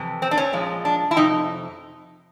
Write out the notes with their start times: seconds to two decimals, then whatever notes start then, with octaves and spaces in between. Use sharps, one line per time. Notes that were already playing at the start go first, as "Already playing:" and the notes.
Already playing: F2 C3 E3
0.22 C4
0.31 D4
0.37 C#4
0.53 A#2 F3 G#3
0.85 D4
1.11 E4
1.16 F2 C3 D#4